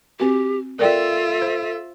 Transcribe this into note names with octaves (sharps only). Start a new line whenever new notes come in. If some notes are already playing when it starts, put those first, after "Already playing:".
C4 F#4 G4
F4 A4 A#4 D5 E5 G5
C5